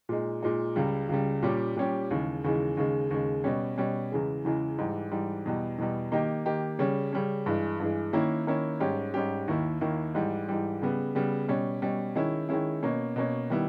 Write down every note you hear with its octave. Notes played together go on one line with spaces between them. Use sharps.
A#2 G#3 D#4
A#2 G#3 D#4
C#2 C#3 G3
C#2 C#3 G3
A#2 G3 C#4 G4
A#2 G3 C#4 G4
D#2 C#3 E3 G#3
D#2 C#3 E3 G#3
D#2 C#3 G#3
D#2 C#3 G#3
B2 G3 C#4
B2 G3 C#4
E2 C#3 E3 G#3
E2 C#3 E3 G#3
G#2 E3 G3
G#2 E3 G3
E2 B2 G3
E2 B2 G3
D#3 A#3 D#4 G4
D#3 A#3 D#4 G4
C#3 G3 C#4
C#3 G3 C#4
G2 E3 G#3
G2 E3 G#3
D#3 A#3 C#4 E4
D#3 A#3 C#4 E4
G#2 G3 C#4 G4
G#2 G3 C#4 G4
D#2 D#3 A#3 E4
D#2 D#3 A#3 E4
G#2 E3 G3
G#2 E3 G3
C#3 G3 B3
C#3 G3 B3
B2 G3 C#4
B2 G3 C#4
D#3 G#3 C#4 E4
D#3 G#3 C#4 E4
B2 A#3 C#4
B2 A#3 C#4
D#3 G3 B3 E4